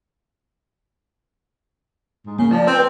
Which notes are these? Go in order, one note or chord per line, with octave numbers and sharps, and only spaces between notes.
G#2
C#3 A#3
F3 D5 A5
C4 B4 G5